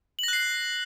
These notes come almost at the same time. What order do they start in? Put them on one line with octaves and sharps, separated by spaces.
F#7 A#6 F#6 C7